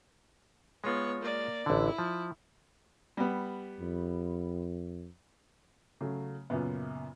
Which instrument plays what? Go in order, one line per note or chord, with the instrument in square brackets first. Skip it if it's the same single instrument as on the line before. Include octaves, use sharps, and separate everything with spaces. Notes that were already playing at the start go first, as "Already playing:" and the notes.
[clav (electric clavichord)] G#3 F4 [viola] B3 C#5
[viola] A#3 D5
[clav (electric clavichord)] A1 D3 [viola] E4
[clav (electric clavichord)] F3
[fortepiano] G3 B3
[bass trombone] F2
[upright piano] C#3 F#3 A3
F#2 A#2 C#3 B3